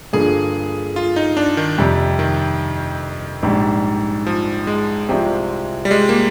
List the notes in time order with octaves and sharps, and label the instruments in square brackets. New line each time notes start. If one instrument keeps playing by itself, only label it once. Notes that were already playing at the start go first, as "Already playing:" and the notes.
[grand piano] G2 D3 F3 A#3 [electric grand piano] G#4
[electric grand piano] F4
D#4
D4
D#3
[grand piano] F2 C3 G3
[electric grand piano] D#3
[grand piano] A#1 G#2 G3
[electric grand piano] F3
G#3
[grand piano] C2 C3 F3 C4 G4
[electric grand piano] G3
G#3
A#3